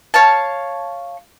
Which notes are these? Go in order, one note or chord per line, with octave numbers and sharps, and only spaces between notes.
C#5 F5 A5